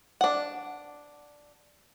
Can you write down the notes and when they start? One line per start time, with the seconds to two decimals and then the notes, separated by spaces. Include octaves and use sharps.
0.21 D4 F#5